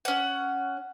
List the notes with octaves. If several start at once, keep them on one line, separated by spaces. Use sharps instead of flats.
C#4 F#5